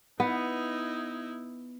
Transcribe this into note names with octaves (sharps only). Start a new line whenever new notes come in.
B3 D#4 E4